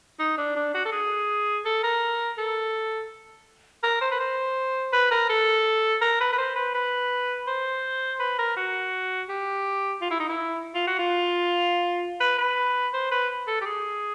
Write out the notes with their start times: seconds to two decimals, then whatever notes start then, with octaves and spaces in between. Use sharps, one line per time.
0.19 D#4
0.38 D4
0.56 D4
0.74 F#4
0.85 A4
0.92 G#4
1.65 A4
1.84 A#4
2.38 A4
3.83 A#4
4.01 C5
4.11 B4
4.20 C5
4.93 B4
5.11 A#4
5.29 A4
6.01 A#4
6.20 B4
6.33 B4
6.38 C5
6.56 B4
6.75 B4
7.47 C5
8.20 B4
8.39 A#4
8.57 F#4
9.29 G4
10.02 F4
10.10 E4
10.20 D#4
10.29 E4
10.74 F4
10.87 F#4
10.99 F4
12.20 B4
12.39 B4
12.93 C5
13.12 B4
13.47 A4
13.61 G4
13.65 G#4